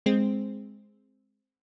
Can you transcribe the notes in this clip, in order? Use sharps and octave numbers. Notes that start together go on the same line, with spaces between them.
G#3 C4